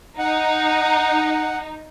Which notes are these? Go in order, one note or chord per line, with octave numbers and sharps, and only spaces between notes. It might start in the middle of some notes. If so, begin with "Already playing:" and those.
D#4 F#5